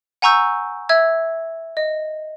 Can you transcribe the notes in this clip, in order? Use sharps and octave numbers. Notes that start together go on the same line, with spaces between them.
F#5 G#5 A#5 C#6 E6 G6
E5 E6 G#6
D#5